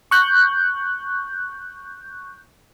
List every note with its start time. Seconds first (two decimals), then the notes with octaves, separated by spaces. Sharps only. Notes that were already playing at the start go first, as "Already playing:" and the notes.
0.11 C#6 F#6 G6